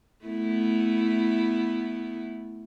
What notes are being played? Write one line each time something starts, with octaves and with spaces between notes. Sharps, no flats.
A3 B3 E4